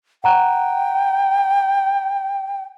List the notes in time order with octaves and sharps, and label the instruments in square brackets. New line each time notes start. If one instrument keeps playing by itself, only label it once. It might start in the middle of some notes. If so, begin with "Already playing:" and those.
[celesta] F#5 A#5 F#6 [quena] G5